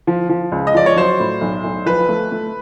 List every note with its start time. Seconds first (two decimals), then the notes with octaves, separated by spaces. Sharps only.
0.07 F3
0.29 F3
0.52 C#2
0.67 D#5
0.74 F3 D5
0.86 C#5
0.96 F#3 C5
1.20 A2
1.41 B1
1.64 B1
1.86 F3 B4
2.09 A3
2.32 A3